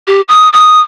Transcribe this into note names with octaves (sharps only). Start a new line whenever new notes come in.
G4
D#6
D#6